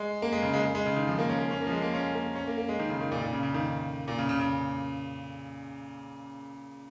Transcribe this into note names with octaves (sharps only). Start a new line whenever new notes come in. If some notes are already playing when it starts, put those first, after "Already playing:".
Already playing: G#3
A#3
G#3
C#3
G#3
G#3
G#3
C#3
D#3
F3
A#3
C#4
A#3
C#4
A#3
F3
G#3
A#3
C#4
A#3
C#4
A#3
A#3
G#3
D#3
C#3
D#3
A#2
A#2
C#3
C#3
D#3
A#2
C#3
C#3
C#3